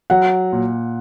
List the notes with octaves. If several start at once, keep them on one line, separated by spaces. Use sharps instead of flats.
F#3 F#5
A#2